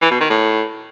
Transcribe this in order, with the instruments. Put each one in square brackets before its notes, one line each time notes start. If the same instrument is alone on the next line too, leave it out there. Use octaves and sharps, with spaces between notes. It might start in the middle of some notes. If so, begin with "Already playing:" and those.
[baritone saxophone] E3
B2
D#3
A2